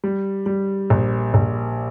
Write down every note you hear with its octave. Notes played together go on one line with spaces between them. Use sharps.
G3
G3
A#1
A#1